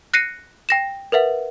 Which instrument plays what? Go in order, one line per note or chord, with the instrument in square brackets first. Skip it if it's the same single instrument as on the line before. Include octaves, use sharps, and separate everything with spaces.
[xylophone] F#6 A#6 C7 C#7 D#7
G5 A#6 E7
A#4 B4 E5 F#5